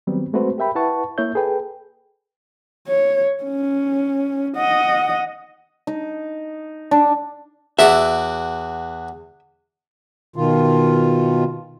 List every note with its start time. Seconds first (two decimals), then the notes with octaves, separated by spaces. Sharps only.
0.07 D#3 F#3 G3 B3 C4
0.33 G#3 A3 C4 F#4 B4 C5
0.58 G4 A#4 E5 G5 B5
0.75 E4 B4 F#5 A5 C#6
1.18 A#3 E4 C#5 E5 G6
1.35 G#4 A4 B4 G5
2.88 C#5
3.44 C#4
4.57 D#5 F#5
5.87 D#4
6.91 D4
7.79 E2 F#4 E5 D6
10.36 B2 D#3 F4